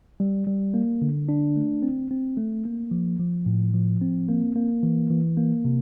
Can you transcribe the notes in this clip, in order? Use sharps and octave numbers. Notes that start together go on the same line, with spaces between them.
G3
G3
A#3
D3
D4
A3
C4
C4
A3
A#3
F3
F3
A2
F3
C4
A#3
A#3
E3
E3
A#3
C3